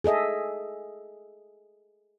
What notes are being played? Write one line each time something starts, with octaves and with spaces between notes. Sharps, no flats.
G#4 A4 D#5 E5